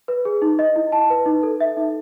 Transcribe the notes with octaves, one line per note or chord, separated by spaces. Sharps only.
B4
G#4
D#4
D#5
E4
A5
B4
D#4
A4
E5
D#4